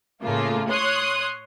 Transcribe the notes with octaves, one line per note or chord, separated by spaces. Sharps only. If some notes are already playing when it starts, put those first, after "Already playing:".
A2 C#3 A3 A#3 F4
C#5 C6 D#6 F#6